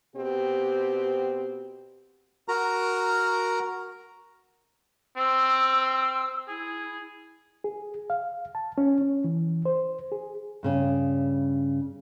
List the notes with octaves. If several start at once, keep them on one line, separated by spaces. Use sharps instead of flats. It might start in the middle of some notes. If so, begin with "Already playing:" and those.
B2 C4 G4
F#4 A#4 A#5
C4 E6
E4 G#4
G#4
F5
A5
C#4
C#4
E3
C5
G#4
G2 C#3 C#4